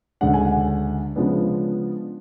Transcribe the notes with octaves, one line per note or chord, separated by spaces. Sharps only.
D2 C#3 G#3 D4 F#5
G#5
F#5
C#3 F3 G#3 B3 D4